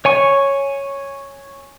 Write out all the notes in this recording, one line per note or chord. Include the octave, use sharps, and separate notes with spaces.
C#5 G#5 C#6